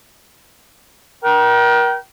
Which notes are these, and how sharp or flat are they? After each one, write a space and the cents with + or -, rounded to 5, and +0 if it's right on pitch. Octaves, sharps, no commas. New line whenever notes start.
A#4 +35 G5 -30